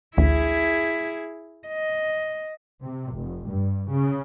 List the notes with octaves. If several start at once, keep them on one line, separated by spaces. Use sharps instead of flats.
A1 D2 E4 G#4
D#5
C3
F1
G2
C#3